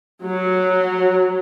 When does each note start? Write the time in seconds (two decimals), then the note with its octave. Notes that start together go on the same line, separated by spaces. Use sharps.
0.25 F#3